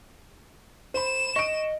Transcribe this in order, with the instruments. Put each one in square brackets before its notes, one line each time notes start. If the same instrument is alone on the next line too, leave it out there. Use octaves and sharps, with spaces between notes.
[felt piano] C5 B5 [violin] E7
[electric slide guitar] D#5 [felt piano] C#6 D7